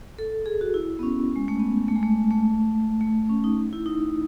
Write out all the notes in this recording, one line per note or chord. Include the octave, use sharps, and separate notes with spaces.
A4
G#4
F#4
E4
B3
C#4
G#3
A3
B3
A3
G#3
A3
A3
A3
C#4
D#4
E4
D#4